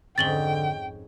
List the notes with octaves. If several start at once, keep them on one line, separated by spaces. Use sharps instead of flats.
F2 G#2 D3 C#4 G5 A6 F#7 G7